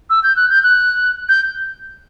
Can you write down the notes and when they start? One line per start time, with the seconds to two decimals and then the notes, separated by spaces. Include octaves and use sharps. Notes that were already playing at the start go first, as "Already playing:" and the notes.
0.10 E6
0.23 G6
0.36 F#6
0.50 G6
0.63 F#6
1.29 G6